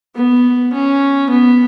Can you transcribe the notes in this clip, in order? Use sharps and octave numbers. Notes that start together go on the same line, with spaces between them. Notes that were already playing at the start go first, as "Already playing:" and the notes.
B3
C#4
B3